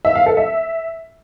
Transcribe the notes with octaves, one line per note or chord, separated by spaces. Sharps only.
E5
F5
A4
E5